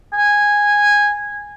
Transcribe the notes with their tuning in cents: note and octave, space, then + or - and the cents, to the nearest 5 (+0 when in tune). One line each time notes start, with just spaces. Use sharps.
G#5 -10